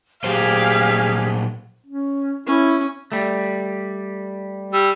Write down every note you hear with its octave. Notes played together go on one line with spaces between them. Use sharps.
A#2 F#3 G4 G#4 C5 F5
C#4
C#4 E4
G3 A3
G3 E6